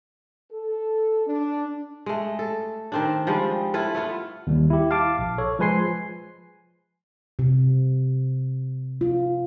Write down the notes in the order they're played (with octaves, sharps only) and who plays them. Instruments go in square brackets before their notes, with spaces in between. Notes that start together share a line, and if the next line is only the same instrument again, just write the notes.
[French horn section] A4
D4
[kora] G#3 A3
A4
D#3 C4 D4
F3 G3 G#3
E4 F4 A4 B4
A3 B3 F4
[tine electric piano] D#2 G3
E4 G4
F5 A5 D6
A#1
A4 C#5
F3 G#3 B4 G#5 C6 C7
[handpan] C3
F4